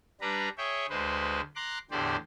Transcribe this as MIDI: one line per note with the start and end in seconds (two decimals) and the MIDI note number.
0.21 0.49 55
0.21 0.49 62
0.21 0.49 71
0.21 0.49 82
0.58 0.86 68
0.58 0.86 73
0.58 0.86 76
0.58 0.86 79
0.90 1.41 38
0.90 1.41 56
0.90 1.41 71
0.90 1.41 72
1.56 1.78 82
1.56 1.78 84
1.56 1.78 86
1.56 1.78 90
1.91 2.16 40
1.91 2.16 45
1.91 2.16 50
1.91 2.16 67
1.91 2.16 72
1.91 2.16 74